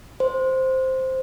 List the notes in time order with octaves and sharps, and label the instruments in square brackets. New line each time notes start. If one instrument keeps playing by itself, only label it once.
[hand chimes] C5